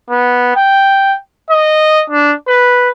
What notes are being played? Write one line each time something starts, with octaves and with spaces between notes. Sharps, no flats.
B3
G5
D#5
D4
B4